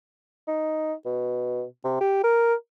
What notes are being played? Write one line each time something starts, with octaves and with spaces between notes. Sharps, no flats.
D#4
B2
C3
G4
A#4